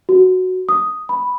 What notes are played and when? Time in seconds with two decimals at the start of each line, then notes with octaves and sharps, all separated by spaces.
0.09 F#4
0.69 D#6
1.09 B5